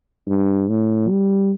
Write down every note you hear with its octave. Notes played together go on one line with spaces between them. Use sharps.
G2
A2
G3